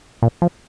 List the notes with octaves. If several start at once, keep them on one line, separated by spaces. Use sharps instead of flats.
A#2
F3